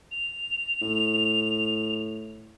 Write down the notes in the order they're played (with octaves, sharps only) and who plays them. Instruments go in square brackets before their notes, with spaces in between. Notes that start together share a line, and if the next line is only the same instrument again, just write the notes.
[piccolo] F7
[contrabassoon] A2